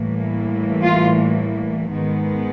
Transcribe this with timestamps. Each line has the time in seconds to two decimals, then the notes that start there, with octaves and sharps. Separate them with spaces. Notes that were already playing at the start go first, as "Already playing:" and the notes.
Already playing: A2 E3 G3 A#3
0.83 F4
1.91 G#2 D#3 G#3 B3